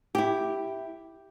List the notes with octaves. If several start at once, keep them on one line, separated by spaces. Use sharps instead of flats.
E4 G4